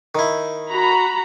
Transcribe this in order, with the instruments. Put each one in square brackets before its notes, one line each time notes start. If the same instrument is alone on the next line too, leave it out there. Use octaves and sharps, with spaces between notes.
[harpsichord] D#3 E4
[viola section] F#4 A#5 B5